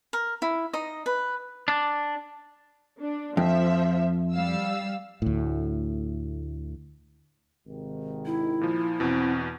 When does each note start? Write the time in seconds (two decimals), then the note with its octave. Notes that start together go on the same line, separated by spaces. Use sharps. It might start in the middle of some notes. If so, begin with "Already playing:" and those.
0.13 A#4
0.42 E4
0.73 D#4 D#5
1.06 B4
1.68 D4
2.99 D4
3.37 F2 F3 E5
4.34 G3 F5 E6
5.22 D2 A2
7.67 G#1 C3 D#3
8.26 E4
8.61 A#2 F3
9.00 E2 B2 C4